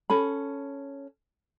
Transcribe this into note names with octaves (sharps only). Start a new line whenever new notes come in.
C#4 A4 B5